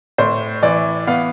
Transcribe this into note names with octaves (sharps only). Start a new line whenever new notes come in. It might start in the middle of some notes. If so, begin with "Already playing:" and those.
A2 C5
E3 D5
B3 F5